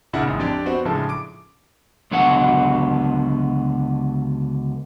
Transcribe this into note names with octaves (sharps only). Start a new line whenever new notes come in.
A#2 C#3 D4 E4 F#5
A1 G#2
F2 D4 G4 D5
B3 C4 F#4
A2 C#3 F3 G#3 D4 A4
D6 D7
C#2 D3 F#3 B3 F#5